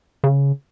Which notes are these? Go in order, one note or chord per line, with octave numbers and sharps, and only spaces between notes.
C#3